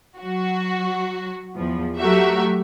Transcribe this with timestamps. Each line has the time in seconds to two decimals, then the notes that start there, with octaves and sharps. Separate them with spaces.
0.19 F#3 F#4
1.55 E2 F3
1.98 F#3 A3 F#4 G4 A#4 E5